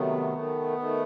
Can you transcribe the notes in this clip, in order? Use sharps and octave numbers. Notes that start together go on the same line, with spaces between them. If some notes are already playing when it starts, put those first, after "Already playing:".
Already playing: C3 D#3 F#3 A3 B3
D#3 A3
D#3 A3